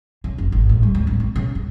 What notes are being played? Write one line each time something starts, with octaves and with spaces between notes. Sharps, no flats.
C#3
F#1
G#1
A2
G3
C#2
A1
C4
C#3
D#1